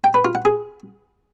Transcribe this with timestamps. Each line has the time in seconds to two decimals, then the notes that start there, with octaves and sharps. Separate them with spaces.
0.04 G5
0.14 B4
0.25 F4
0.35 F#5
0.45 G#4